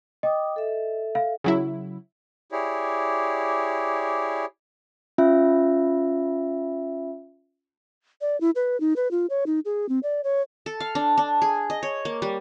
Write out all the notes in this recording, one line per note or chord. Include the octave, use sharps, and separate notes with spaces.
D#5 G5 D6 D#6
A4 E5
F5
C#3 F#3 E4
E4 G4 G#4 C#5 D5
C#4 F4 E5
D5
E4
B4
D#4
B4
F4
C#5
D#4
G#4
C4
D5
C#5
A4
F5
D4
D4
G#4
D#5
C#5
A#3
G3